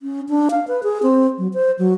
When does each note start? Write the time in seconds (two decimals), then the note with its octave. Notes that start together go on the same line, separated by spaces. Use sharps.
0.01 C#4
0.29 D4
0.51 F5
0.68 B4
0.83 G#4
1.03 C4
1.38 F#3
1.54 C5
1.79 F#3